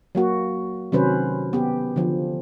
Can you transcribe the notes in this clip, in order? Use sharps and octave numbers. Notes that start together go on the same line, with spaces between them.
F#3 A#3 F#4
C3 D#3 F#3 C#4 B4 C5
B3 G4
D3 F3